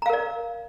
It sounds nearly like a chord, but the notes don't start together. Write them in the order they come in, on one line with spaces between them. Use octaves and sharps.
A#5 F5 A#4 D5